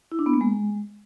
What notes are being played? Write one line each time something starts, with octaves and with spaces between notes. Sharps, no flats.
E4
D4
B3
A#3
G#3